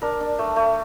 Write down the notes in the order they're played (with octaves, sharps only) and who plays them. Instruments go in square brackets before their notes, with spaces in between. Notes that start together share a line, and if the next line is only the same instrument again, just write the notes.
[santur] D4 A#4
D4
A3
A3